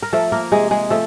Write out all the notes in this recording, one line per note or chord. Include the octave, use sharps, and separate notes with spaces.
A#4
F3 A3 A4
A#3 A#4
C3 G#3 G#4
G#3 G#4
F3 A3 A4